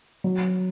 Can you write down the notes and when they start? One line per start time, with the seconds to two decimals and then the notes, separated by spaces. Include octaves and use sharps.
0.24 F#3